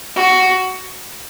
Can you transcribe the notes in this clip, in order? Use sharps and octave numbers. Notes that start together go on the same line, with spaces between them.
F#4